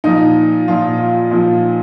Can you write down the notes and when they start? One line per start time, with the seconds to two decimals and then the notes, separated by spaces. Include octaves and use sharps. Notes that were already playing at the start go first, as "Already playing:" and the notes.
0.04 A#2 F3 D#4
0.68 A#2 F3 F4
0.99 F4
1.31 A#2 F3